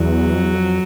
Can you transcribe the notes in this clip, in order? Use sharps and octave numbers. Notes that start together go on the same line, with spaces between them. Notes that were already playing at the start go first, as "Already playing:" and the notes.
Already playing: E2 F#3
F2
E2
F2